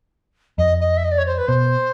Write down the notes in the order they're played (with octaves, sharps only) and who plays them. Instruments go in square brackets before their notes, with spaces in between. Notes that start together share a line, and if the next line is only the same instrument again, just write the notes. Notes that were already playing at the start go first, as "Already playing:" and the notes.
[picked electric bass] F2 [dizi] D#5
[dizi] D#5
E5
D#5
D5
C#5
C5
B4
[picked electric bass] B2 [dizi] C5